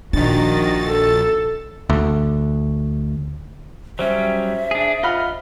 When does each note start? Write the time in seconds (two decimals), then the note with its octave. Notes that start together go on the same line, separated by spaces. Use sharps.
0.13 A#1 D#3 D4 F#4 A6
0.87 A4
1.90 D2
3.99 F#3 G3 C#4 C5 E5
4.71 D4 G#4
5.03 F4 D#5 F#5 B5 F6